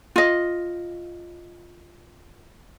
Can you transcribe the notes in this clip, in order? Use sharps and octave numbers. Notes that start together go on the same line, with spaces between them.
F4 D#5